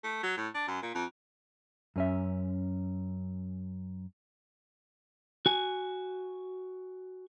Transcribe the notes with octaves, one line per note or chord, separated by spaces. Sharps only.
A3
F#3
A2
D4
F#2
A#2
F2
F#2 C#4 E5
F#4 G#5